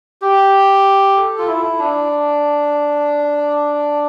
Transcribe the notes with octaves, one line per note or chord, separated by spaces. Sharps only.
G4
A4
F4
E4
D4